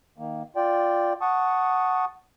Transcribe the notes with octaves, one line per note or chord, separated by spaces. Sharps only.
D#3 A#3
F4 D5 G5
F#5 A5 C#6 D#6